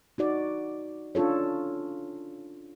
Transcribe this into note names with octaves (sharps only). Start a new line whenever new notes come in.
D#4 F#4 D5
C#4 D4 F4 A4 C#5